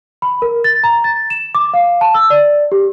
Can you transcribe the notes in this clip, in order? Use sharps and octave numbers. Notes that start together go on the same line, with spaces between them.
B5
A#4
A6
A#5
A6
E7
D6
F5
A5
E6
D5
G4